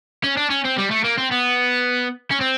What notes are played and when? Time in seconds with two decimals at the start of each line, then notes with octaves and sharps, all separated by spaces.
0.24 C#4
0.37 D4
0.50 C#4
0.65 C4
0.78 G3
0.91 A3
1.04 A#3
1.18 C4
1.32 B3
2.31 C#4
2.41 C4